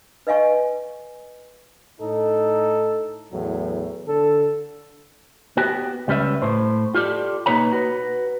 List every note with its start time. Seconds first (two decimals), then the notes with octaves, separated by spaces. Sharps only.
0.27 B4 D#5 F5 G#5 C#6
2.00 A2 D#4 A4
3.32 E2 A2 F#3
4.07 D3 A4
5.57 B3 F#4 G4
6.08 C#2 G3 C#4 B4 E5
6.42 A2 C5
6.95 F4 G4 A4 D5
7.46 B2 A#3 D#4 B4 C#5 A#5
7.72 F#4 B4